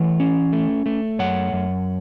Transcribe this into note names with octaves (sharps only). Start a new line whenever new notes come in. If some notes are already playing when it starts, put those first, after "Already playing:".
Already playing: E3 A3 C#5 F#5
C#4
A3
A3
F#2 C#5 F#5
F#2